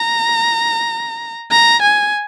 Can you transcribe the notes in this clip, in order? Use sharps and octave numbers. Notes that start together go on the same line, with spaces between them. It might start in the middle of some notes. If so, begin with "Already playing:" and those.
Already playing: A#5
A#5
G#5